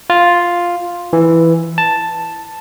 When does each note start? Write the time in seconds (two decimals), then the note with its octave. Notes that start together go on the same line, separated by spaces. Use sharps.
0.10 F4
1.13 E3
1.78 A5